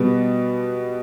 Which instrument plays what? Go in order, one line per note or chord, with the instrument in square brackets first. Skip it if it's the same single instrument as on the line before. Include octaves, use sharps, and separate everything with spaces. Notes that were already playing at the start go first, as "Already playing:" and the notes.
Already playing: [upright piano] B2 G3 B3